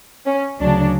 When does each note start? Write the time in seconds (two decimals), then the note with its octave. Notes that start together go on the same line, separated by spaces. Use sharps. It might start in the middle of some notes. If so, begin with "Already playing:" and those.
0.27 C#4
0.60 D2 C#3 F#3 D4